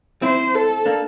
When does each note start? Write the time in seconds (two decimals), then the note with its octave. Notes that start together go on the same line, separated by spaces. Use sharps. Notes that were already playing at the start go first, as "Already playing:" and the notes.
0.22 C4 E4 C5
0.55 A4
0.86 A#3 D4